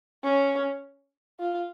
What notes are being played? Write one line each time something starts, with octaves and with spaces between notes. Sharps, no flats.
C#4
F4